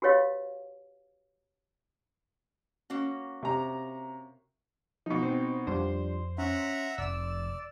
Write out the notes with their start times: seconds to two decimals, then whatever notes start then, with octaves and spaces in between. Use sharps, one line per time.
0.02 F#4 G4 B4 C#5 D#5 F5
2.90 A#3 C#4 F#4
3.43 C3 A#5
5.06 B2 F3 D#4
5.23 C4 C5
5.67 F2 F3 G3 D4 C5
6.38 C#4 E5 F#5 A#5
6.98 F1 F2 D5 E6 E7